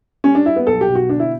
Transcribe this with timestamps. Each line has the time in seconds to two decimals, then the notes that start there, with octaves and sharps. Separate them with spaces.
0.24 G3 C#4
0.35 D4
0.45 G3 E4
0.56 B3
0.67 B1 A4
0.81 G4
0.88 B2
0.95 F#4
1.09 D3 D4
1.20 E4